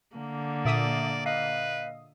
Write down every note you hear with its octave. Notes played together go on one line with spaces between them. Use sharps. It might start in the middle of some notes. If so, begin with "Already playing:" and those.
D3 A#3
A#2 D5 E5 D#6
B4 D#5 F5